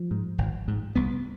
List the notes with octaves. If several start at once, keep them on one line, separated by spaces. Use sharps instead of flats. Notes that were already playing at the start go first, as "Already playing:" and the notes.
Already playing: F3
G#2
G#1
G#2
C2 B3